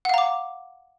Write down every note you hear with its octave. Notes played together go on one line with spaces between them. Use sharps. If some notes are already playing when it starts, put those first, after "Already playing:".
F5 F#5 A#5 D6